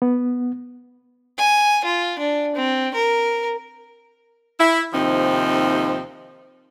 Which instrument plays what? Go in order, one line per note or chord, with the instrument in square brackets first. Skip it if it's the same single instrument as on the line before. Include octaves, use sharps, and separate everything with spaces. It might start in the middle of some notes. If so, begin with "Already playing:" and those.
[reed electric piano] B3
[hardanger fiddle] G#5
F4
D4
C4
A#4
[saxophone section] E4
D#2 C3 F3 C4 D#4